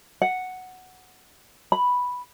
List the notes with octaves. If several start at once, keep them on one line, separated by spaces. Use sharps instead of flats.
F#5
B5